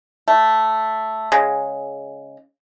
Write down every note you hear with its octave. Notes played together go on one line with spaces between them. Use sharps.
A3
C#3 G#3